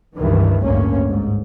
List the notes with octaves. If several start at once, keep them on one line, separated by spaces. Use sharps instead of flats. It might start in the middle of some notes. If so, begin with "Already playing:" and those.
C#2 G2 D#3 E3
A1 D2 G2 A#3 C#4
G#2